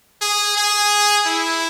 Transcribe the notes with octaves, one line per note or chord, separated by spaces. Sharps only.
G#4
G#4
E4